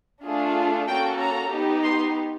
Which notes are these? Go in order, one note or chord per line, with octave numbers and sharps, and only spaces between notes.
A3 D4 F4 G#4
A#3 C#4 F#4 A4 G5
A#5
B3 D#4 G4
C6